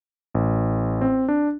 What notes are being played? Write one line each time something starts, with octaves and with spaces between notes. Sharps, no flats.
A1
C4
D4